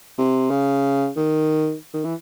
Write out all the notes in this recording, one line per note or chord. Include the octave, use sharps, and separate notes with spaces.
C3
C#3
D#3
D#3
E3